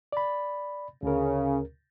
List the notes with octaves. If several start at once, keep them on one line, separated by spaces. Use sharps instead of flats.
D5 B5
D2 C#3 A#4